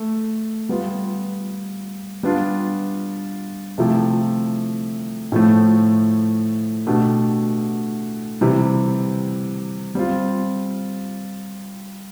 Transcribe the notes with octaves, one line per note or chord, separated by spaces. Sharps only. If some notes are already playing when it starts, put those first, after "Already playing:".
Already playing: A3
G3 B3 F4
G3 B3 D4 F4
C3 F3 A3 E4 G4
A2 F3 A3
B2 A3 D4 G4
C3 E3 G3
G3 C4 F4